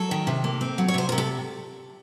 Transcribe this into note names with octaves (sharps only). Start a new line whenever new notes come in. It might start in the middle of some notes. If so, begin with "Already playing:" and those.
Already playing: F#3 A4
D#3
C3
A#3
C4
F#3
C#5
C3 C5
C3 A#4
A4